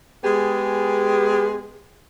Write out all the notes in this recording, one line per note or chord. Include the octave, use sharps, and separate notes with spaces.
G#3 B3 G4 G#4